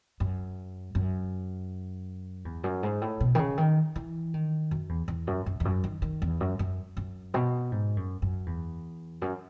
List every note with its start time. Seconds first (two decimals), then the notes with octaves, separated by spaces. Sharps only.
0.20 F#2
0.95 F#2
2.45 E2
2.64 F#2
2.83 G#2
3.02 A2
3.20 B2
3.35 D#3
3.39 C#3
3.58 D#3
3.96 E3
4.34 D#3
4.71 F#2
4.89 E2
5.08 E2
5.27 F#2
5.46 F#2
5.60 E2
5.65 F#2
5.84 D#3
6.02 D#3
6.22 E2
6.40 F#2
6.59 F#2
6.97 F#2
7.34 B2
7.72 G#2
7.97 F#2
8.22 F#2
8.46 E2
9.22 F#2